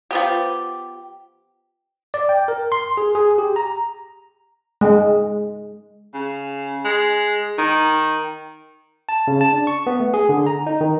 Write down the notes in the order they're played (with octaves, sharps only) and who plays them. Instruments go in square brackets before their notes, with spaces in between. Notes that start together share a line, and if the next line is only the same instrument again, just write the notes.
[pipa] F3 B3 G4
[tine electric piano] D5
G5
A#4
C6
G#4
G#4
G4
A#5
[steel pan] G#3
[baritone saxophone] C#3
G#3
D#3
[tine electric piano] A5
C#3
A5
D4
C#6
B3
A3
G#4
D3
A#5
D#4
D#3